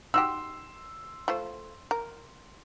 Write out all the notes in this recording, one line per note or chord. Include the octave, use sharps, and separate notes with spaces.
D#4 F#4 G4 C6 E6
A3 F4 C5
A#4